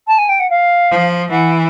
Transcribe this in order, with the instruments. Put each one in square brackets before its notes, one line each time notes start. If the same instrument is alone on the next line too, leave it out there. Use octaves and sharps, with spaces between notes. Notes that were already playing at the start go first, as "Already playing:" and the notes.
[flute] A5
G#5
G5
F#5
F5
[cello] F3
[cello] E3 [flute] F#5